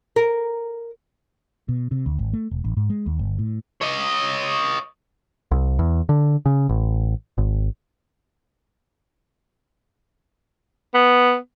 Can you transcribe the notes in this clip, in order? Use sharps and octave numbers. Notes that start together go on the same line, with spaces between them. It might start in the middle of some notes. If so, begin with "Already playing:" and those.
A#4
B2
C3
D2
G#1
A3
E1
A1
G#2
G#3
D#2
G1
A2
C#5 D#5
C2
E2
D3
C#3
A1
G#1
B3